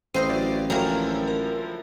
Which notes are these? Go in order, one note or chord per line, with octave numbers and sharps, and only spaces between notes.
A1 C4 C5 D#5 F5 C7 D#7
F#3 E4 D5
D3 F3 F#3 A#3 E4 A#4 G5 G#5
A#4